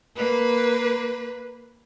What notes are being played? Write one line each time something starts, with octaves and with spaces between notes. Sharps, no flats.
A#3 B4